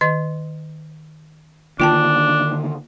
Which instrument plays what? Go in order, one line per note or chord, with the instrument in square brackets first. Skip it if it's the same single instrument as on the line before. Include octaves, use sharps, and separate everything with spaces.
[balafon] D#3 D#5
[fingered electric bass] D3 D#3 A#3 [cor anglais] D4 [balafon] F4 G5 A5